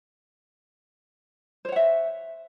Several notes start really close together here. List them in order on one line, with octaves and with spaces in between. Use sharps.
C5 C#5 F#5 E5